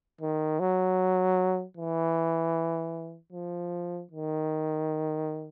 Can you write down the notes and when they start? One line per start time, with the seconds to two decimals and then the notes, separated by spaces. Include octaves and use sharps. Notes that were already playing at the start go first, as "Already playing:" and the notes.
0.21 D#3
0.60 F#3
1.77 E3
3.32 F3
4.11 D#3